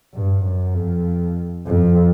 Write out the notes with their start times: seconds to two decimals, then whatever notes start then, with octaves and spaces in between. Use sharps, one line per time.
0.13 G2
0.44 F#2
0.75 F2
1.66 F2